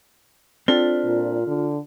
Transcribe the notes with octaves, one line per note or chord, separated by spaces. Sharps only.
C4 D4 F4 A4
A#2
D3